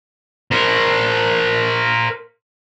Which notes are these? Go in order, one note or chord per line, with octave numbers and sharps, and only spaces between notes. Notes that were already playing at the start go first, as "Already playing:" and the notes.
A#4 C5